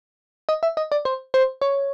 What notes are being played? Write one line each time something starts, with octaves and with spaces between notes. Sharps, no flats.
D#5
E5
D#5
D5
C5
C5
C#5